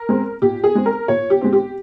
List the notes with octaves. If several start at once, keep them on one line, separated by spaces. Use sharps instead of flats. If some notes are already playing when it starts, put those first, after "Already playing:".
Already playing: A#4
G#3 C4
A#2 G4
G#4
G#3 C4
A#4
A#2 C#5
G4
G#3 C4
G4